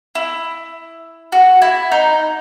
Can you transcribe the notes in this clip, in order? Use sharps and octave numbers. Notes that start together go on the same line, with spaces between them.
E4
F#4
E4
D#4